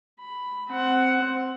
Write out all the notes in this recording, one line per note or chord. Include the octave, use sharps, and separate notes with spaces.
B5
C4 F#5